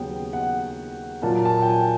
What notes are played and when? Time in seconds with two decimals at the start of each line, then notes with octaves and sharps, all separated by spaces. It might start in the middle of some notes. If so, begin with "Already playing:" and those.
Already playing: D#2 C#3 F#3 B3 G5
0.33 F#5
1.22 A#2 F#3 A#3 A5
1.45 A5
1.62 G5
1.68 G#5